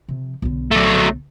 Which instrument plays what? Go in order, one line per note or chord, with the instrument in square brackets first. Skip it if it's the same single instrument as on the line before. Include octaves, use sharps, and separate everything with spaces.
[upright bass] C3 F3
B1 D3
[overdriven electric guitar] F#3 A3